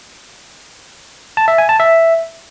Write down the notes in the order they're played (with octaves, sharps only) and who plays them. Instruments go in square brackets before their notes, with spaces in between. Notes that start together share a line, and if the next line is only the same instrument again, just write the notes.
[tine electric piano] A5
E5
G#5
A5
E5